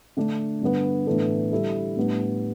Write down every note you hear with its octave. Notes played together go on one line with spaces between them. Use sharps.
D3 A3 D4
G2 D3 B3
A2 E3 B3 D4 A4
D3 G3 E4 A4
A2 G3 B3 D4